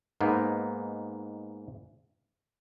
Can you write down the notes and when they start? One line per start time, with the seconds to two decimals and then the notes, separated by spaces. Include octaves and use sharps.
0.21 G#2 A#3 B3 D#4